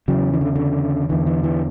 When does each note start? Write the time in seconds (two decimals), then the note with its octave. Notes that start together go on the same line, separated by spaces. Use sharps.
0.08 E2 C#3 F#3
0.34 E3
0.41 D3
0.56 D3
1.09 E2 D3 E3
1.27 E3
1.44 E3